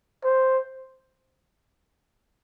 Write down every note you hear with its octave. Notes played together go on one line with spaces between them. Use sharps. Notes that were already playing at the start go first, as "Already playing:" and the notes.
C5